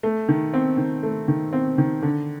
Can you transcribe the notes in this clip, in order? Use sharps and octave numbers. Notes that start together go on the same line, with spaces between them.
A3
D#3
C4
D#3
A3
D#3
C4
D#3
D3